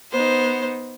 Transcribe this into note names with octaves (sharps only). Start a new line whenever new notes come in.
B3 D#4 C5